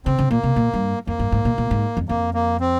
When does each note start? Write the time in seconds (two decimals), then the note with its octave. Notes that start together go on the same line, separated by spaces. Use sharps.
0.06 C#3 C4
0.18 C#3
0.30 A#2 A#3
0.43 C3
0.56 A#2
0.74 G2
1.07 F2 A#3
1.19 G2
1.32 G#2
1.45 A#2
1.58 A#2
1.71 G#2
1.97 F2
2.09 F2 A#3
2.34 A#3
2.60 C4